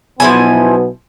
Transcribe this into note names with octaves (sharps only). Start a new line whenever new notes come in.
B1 B2 F3 B3 E4 G#5